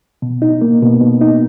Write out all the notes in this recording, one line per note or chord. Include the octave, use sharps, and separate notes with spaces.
B2
D#4
A#3
B2
B2
D#4